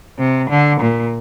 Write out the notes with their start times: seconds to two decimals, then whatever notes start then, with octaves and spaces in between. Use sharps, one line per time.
0.19 C3
0.50 D3
0.81 A#2